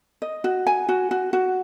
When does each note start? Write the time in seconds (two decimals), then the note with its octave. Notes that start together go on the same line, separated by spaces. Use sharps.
0.22 D#5
0.44 F#4
0.67 G#5
0.89 F#4
1.11 F#4
1.33 F#4